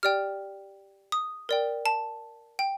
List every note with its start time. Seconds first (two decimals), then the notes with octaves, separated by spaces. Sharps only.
0.03 G4 D5 G5 F6
1.12 D#6
1.49 A#4 D5 G5
1.86 A5
2.59 G5